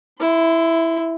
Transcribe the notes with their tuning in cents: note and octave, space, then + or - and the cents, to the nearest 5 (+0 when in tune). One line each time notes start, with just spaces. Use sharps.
E4 +0 C6 -40